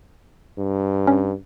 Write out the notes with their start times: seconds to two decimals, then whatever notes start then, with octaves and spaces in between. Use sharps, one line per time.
0.58 G2
1.07 C#4